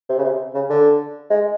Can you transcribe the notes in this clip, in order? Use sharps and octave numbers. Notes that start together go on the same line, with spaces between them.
C3
C#3
C3
C#3
D3
G#3